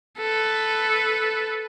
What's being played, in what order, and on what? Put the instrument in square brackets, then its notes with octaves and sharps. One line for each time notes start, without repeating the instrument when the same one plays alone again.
[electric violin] A4 B4